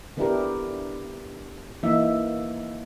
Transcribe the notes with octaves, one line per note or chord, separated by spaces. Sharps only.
D3 B3 D4 E4 G4 A#4
E3 A#3 D#4 E5